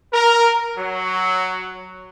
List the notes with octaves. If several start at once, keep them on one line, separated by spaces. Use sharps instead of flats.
A#4
F#3